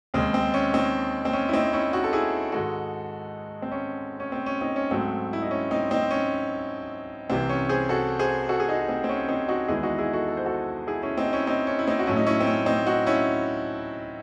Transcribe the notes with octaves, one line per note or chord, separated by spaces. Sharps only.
D#2 C#3 G#3 C4
C4
C#4
C4 D#4
C4
C#4
E4
C4 D#4
C#4 E4
D#4 F#4
A4
E4 G#4
G#2 D#3 G#3 F#4 A4
C4
C#4
C#4
C4
C#4
C4 D#4
C#4
G#2 F#3 A3 C4
E4
D#4
C#4
C4 D#4
C4 D#4
C#4
C2 C3 E3 C4
C#4
G#4 C5
F#4 A4
G#4 C5
F#4 A4
G#4
D#4 F#4
C4 D#4
C4
C#4
C4 D#4
D#4 F#4
E2 D#3 G#3 E4 G#4
D#4 F#4
E4 G#4
F#4 A4
A4
C5
F#4 A4
E4 G#4
C#4 E4
C4 D#4
C#4 E4
C4 D#4
C#4
E4
C4 D#4
F#4
A2 F#3 A3 C#4 E4
D#4
C#4 E4
C4
C#4
C4 D#4
D#4 F#4
C#4 E4